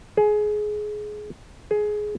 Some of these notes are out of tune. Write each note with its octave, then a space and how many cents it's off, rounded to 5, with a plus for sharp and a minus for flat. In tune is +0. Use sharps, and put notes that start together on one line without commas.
G#4 +20
G#4 +15